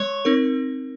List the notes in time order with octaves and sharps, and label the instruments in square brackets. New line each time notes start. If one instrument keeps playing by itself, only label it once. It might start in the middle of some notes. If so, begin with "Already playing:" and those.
Already playing: [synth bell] G#3 [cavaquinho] C#5
[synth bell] C4 D#4 A#4